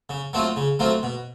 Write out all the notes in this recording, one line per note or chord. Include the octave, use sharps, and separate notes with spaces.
C#3
F#3 A3 C4 F4
C#3
F#3 A3 C4 F4
B2